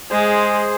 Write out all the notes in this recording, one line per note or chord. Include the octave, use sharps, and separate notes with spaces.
G#3 G#4 C5